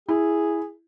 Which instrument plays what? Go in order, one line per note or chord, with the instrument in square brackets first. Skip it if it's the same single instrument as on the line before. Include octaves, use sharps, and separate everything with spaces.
[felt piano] E4 [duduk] G#4